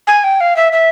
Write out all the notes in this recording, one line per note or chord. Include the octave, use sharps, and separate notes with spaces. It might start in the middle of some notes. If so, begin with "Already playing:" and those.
G#5
G5
F5
E5
E5